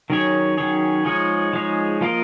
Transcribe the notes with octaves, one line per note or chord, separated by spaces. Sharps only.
D#3 F#3 C#4 G#4 C#5
D#3 F#3 C#4 G#4 C#5
F3 G#3 D#4 G#4 C#5
F3 G#3 D#4 G#4 C#5
F3 A#3 F4 A#4 D#5